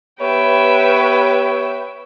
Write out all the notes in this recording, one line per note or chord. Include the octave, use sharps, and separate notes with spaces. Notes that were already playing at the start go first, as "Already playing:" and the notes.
B3 G4 B4 C#5 E5 G5